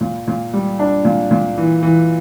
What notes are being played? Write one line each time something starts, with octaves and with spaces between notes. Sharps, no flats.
A#2
A#2
G3
D4
A#2
A#2
E3
E3